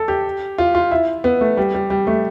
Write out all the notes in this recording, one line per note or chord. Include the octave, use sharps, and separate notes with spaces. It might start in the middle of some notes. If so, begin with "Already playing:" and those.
Already playing: A4
G4
F4
F4
E4
B3
A3
G3
G3
G3
A3